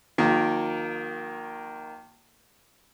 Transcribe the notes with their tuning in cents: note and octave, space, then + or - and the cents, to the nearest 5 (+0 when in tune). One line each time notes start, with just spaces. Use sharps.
D#3 +0 F#3 -45 A#3 +5